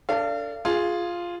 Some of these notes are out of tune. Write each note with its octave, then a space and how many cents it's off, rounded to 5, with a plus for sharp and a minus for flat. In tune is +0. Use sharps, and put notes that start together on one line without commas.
D4 -15 A4 +35 F5 -30
F4 +0 G#4 +0